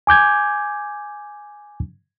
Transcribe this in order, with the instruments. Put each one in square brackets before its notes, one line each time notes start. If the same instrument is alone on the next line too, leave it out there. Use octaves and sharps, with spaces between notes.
[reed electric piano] G#5 D6 G6 G#6